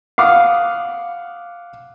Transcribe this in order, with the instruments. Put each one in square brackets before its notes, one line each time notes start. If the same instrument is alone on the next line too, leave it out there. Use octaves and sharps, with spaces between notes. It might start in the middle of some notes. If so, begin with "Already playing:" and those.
[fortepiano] F5 F#5 D6 D#6